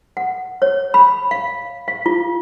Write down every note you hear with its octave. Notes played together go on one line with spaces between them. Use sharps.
F#5
C#5
B5
F5
F5
F4